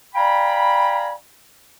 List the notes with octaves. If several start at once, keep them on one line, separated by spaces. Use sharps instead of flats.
D5 F5 G5 G#5 A#5 B5